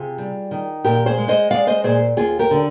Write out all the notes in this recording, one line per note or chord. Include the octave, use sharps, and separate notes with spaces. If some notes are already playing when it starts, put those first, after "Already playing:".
Already playing: C3 F4 G#4
G3
D#3
A#2 G4 A#4
G#4 C5
G#3
C5 D#5
G#3 D5 F5
C5 D#5
A#2 G#4 C5
D#2 F4 G#4
G4 A#4
D3